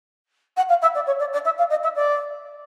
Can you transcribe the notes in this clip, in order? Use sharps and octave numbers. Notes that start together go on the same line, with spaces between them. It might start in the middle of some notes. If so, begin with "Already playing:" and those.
F#5
F5
E5
D5
C#5
D5
D5
E5
F5
D#5
E5
D5